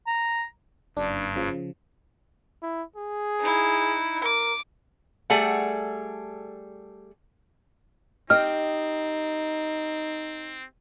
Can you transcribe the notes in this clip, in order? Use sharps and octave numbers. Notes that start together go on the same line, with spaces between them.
A#5
F#1 G2 D4
C#3 F3
E4
G#4
D#4 E4
A#4 D6
G3 A3 G#4 A4 F#5
C4 D#4 G4 D#5 F6